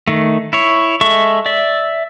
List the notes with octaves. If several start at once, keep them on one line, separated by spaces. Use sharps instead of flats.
D#3 A3
E4 C#5
G#3 A4 E5 C#6
D5 E5